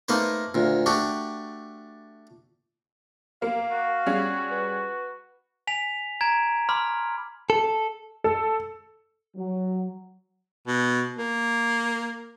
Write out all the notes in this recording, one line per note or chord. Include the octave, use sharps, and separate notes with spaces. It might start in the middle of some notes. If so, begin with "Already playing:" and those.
A3 A#3 D#4 B4 C5
D2 A#2
A3 D4 F#4 G4
A#3 F5
F#4
G3 C#4 G#4
B4
G#5 B6 F7
A#5 G#6 D7
B5 C6 D6 F6
A4
A4
F#3
B2
A#3